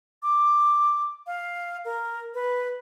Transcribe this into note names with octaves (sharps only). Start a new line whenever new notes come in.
D6
F5
A#4
B4